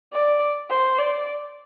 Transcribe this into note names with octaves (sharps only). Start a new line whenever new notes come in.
D5
C5
D5